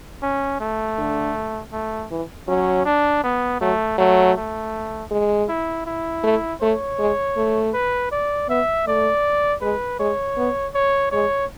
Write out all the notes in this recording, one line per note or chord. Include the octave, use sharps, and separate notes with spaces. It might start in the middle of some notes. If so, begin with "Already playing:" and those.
C#4
A3
D3
A3
E3
F#3 C#4
D4
B3
F#3 A3
F#3 A3
A3
G#3
E4
E4
A3
A3 C#5
G#3
A3
B4
D5
B3 E5
A3 D5
G#3 B4
G#3 C#5
B3
C#5
G#3 C#5